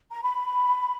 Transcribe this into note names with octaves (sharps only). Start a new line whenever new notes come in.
A#5
B5